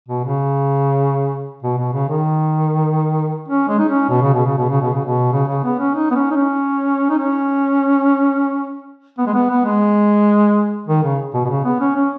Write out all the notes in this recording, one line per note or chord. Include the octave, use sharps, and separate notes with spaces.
B2
C#3
B2
B2
C#3
D#3
C#4
G#3
D#4
C#4
B2
C#3
B2
C#3
B2
C#3
B2
C#3
B2
C#3
C#3
B3
C#4
D#4
B3
C#4
D#4
C#4
D#4
C#4
B3
G#3
B3
B3
G#3
D#3
C#3
B2
B2
C#3
B3
C#4
C#4